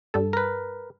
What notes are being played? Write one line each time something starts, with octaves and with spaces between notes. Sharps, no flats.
G2 A4
A#4 B4